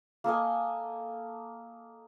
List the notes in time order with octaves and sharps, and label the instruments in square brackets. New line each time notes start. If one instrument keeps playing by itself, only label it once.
[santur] A#3 A4 D#5 G#5